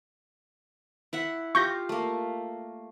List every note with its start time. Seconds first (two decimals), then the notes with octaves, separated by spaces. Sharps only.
1.13 E4 E5 F#5
1.55 F4 G4 C#6 G6 A#6
1.89 A3 A#3